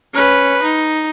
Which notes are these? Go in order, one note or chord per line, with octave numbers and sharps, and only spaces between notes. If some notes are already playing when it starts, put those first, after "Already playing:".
C#4 B4
D#4